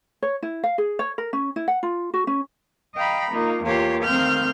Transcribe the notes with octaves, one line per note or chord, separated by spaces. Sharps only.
C#5
E4
F5
G#4
C#5
A#4
C#4
E4
F#5
F4
F#4
C#4
D#5 F5 G5 A#5 B5
A#3 D#4 F4
E2 A#3 F4 G4 C#5
D#3 A3 C4 F5 F6 G6